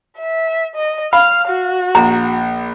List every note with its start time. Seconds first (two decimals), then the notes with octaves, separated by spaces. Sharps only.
0.19 E5
0.75 D#5
1.13 F5 B5 F6
1.48 F#4
1.95 A#1 A#5